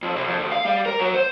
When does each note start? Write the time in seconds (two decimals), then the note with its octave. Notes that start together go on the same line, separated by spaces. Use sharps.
0.02 F2
0.16 C2
0.28 F2
0.39 D2
0.52 F5
0.65 G3
0.86 A#4
1.00 F#3
1.15 C5